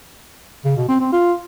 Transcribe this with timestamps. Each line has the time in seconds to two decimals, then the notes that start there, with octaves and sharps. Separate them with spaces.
0.65 C#3
0.77 B2
0.89 C4
1.00 C4
1.12 F4